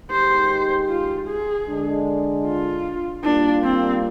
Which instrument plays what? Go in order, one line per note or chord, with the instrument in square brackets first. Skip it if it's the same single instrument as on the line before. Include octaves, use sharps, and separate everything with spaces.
[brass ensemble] D#3 G#3 D#4 G4 [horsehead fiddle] C5
[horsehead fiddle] F4
G#4
[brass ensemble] D3 G#3 D4
[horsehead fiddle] F4
[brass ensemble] G3 A#3 F4 [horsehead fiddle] D4
[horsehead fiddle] C4